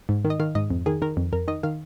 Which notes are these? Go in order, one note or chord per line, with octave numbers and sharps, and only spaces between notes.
G#2
D#3
D#5
D#3 F5
G#2 D#5
F2
D#3 G#4
D#3 A#4
F2
F2 A#4
D#3 D#5
D#3 F5